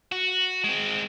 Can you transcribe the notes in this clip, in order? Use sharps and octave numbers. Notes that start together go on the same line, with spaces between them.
F#4
G#3 C4